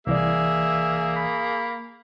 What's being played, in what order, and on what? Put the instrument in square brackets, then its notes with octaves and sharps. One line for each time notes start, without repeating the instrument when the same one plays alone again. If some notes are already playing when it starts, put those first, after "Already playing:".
[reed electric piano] C2 E3 D5 [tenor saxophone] A#3 [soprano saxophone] G#4 [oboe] E5
[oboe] B5